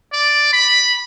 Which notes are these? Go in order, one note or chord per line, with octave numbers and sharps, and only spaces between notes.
D5
B5